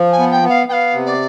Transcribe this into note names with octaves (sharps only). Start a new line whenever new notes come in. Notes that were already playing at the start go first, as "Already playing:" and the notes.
Already playing: F3
G#5
B3
G5
B3
F5
B3 F5 G5
C3
D5